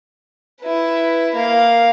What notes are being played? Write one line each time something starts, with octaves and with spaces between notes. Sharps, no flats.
E4 B4
A#3 F5